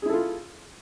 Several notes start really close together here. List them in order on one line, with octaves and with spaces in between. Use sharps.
G#4 E4 A4 F4